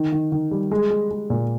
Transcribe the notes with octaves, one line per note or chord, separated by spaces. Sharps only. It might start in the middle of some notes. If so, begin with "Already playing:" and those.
Already playing: D#3
D#3
D#3
G3
G#3
G#3
G#3
A#2